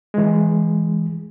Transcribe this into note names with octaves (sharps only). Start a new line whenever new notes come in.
E3 G#3